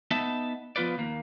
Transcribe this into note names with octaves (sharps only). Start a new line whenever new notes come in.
B3 D#4 E5 A5
F3 B3 F4 B4 D5
D#2 A#3